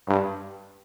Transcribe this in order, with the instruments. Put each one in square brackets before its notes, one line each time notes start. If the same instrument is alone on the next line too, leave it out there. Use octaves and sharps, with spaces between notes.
[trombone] G2